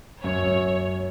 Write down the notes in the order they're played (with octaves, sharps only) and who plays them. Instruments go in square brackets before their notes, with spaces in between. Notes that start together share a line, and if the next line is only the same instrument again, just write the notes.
[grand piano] F#2 [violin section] C#5
[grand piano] F#2